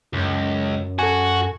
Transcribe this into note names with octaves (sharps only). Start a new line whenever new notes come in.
C#2 F#2
F#4 A4 G#5